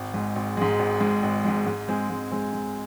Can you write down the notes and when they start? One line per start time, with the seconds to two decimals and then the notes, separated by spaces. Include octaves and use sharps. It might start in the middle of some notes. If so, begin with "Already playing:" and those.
Already playing: G#1
0.14 G#2 G#3
0.36 G#1
0.57 G#2 G#3
0.79 G#1
1.00 G#2 G#3
1.23 G#1
1.44 G#2 G#3
1.66 G#2
1.88 G#3 C4 G#4
2.10 G#2
2.31 G#3 C4 G#4
2.53 G#2